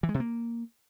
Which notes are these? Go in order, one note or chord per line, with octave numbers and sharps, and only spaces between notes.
E3
G#3
C3
A#3